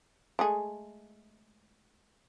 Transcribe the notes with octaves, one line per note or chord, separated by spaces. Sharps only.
G#3 A3 G#4